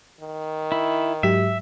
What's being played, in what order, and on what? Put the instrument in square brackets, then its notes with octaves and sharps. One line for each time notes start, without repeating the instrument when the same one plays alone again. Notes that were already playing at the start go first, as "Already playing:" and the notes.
[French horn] D#3
[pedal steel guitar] E4
[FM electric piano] G#2 F#3 G4 [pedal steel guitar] E5